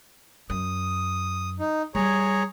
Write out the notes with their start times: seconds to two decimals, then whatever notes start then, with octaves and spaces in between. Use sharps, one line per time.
0.50 F#2 D#6
1.59 D#4
1.95 G3 G#4 C#5 A#5